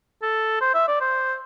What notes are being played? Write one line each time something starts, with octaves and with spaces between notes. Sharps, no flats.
A4
C5
E5
D5
C5